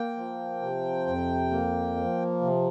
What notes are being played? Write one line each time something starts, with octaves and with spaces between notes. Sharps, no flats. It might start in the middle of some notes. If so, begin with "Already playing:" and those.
Already playing: A#3 G5
F3
C3
F2
A#3
F3
C3